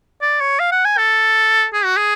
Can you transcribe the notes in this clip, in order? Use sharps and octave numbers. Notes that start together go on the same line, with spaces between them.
D5
C#5
F5
F#5
G#5
A4
G#4
F#4
G#4